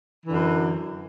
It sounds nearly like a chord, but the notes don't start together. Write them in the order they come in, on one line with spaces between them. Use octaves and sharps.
E3 D3 F#2